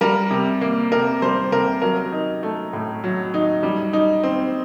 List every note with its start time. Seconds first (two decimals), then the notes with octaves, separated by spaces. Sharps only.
0.01 G3 A#4
0.31 C3
0.61 A#3
0.92 C3 A#4
1.22 G3 C5
1.52 C3 A#4
1.82 F#3 A#4
2.12 D#4
2.43 A3
2.73 A2
3.04 F#3
3.34 D#4
3.63 G3
3.93 D#4
4.23 C4